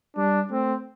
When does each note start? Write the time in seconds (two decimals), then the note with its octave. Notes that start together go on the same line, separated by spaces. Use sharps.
0.17 G3 D4
0.51 A3 C4